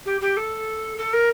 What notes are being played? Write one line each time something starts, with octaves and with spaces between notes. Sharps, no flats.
G4
G4
A4
A4
A#4